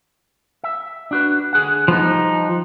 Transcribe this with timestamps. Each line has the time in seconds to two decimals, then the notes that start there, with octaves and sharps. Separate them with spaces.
0.64 E5
1.11 D4 F#4 B4
1.53 D3 G#4 F#5
1.88 D2 F3 B3 D#4
2.05 G3